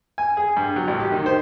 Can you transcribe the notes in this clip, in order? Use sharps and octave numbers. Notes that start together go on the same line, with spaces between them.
G#5
G#4
G2
F#3
A1
G4
D#3
C5